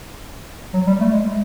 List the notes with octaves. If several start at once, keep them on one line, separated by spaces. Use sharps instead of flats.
F#3
G3
A3
G#3